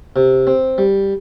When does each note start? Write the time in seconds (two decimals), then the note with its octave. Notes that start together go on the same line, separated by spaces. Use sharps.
0.16 C3
0.47 C4
0.78 G3